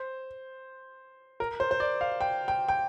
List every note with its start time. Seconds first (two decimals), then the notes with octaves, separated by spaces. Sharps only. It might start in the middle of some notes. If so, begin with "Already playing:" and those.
Already playing: C5
1.40 A#4
1.60 C5
1.71 C5
1.80 D5
2.01 F5
2.21 G5
2.48 G5
2.69 G5